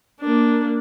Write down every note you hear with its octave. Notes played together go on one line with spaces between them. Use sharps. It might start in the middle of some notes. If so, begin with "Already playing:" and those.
A#3 D4